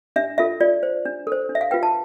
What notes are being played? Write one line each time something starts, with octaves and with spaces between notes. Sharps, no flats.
D4 E5
F4 A4 E5
F4 D5
C5
D4
A4 C5
D4
E5
F5
F4 B4 G5
A5